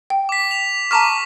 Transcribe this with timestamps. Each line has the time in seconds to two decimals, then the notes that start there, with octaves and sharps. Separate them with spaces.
0.10 G5
0.29 D6 B6
0.51 F7
0.91 A5 A#5 C#6 D6 F6 B6